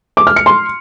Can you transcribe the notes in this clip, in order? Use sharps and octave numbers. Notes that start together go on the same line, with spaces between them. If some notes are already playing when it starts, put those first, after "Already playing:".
D6
F6
C#7
C6